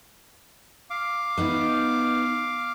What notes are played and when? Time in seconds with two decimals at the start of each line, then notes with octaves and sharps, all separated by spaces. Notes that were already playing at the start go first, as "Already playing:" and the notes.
0.90 F5 D6
1.38 B3 D#4